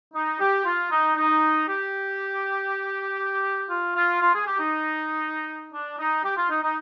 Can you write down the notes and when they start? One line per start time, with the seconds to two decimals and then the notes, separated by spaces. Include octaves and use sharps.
0.14 D#4
0.40 G4
0.65 F4
0.91 D#4
1.16 D#4
1.67 G4
3.70 F4
3.96 F4
4.21 F4
4.34 G#4
4.47 G4
4.59 D#4
5.73 D4
5.99 D#4
6.24 G4
6.37 F4
6.50 D#4
6.63 D#4